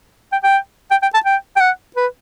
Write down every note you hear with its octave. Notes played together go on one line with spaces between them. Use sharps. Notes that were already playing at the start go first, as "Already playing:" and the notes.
G5
G5
G5
G5
A5
G5
G5
F#5
B4